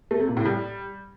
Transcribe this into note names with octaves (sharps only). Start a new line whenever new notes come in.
A3
C3
A#2
A2
G3